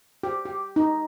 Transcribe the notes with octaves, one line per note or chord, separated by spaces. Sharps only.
G4
G4
D#4